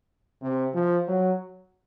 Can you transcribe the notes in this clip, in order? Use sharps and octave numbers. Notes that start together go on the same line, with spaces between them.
C3
F3
F#3